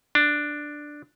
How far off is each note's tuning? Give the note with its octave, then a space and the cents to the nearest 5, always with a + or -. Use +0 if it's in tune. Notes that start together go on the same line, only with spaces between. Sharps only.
D4 +5